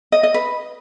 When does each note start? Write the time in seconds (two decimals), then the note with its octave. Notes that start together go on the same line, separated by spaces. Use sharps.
0.12 D#5
0.23 D#5
0.34 B4